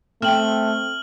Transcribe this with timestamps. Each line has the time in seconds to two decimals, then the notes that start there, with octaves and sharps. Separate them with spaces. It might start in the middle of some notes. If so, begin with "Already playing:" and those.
0.22 A3 C4 F6 F#7